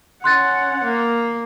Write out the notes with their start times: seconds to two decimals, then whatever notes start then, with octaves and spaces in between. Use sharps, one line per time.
0.24 C#4 F#5 C6 F#6 A6
0.84 A#3